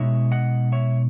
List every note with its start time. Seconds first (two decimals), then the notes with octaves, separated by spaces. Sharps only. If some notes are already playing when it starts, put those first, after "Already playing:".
Already playing: B2 G#3 D#4 C#5 E5
0.31 D#5 F#5
0.72 C#5 E5